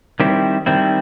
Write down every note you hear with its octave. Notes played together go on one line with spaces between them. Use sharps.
D#3 G3 C4 E4
D#3 G3 C4 E4